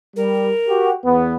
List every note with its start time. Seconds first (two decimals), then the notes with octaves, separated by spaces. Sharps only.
0.16 G3 A#4
0.67 F#4 G4
1.05 E2 B3